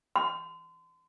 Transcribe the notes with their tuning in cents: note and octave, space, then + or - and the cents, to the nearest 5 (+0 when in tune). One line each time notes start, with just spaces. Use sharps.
C6 -35